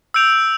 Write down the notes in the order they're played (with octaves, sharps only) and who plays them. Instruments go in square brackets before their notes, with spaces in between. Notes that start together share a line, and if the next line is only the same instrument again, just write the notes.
[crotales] E6 G6 D7 F7